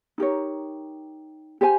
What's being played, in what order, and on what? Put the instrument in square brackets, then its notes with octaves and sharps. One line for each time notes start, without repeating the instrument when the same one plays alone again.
[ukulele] D#4 G4 A#4 C#5
G4 C5 F5 G#5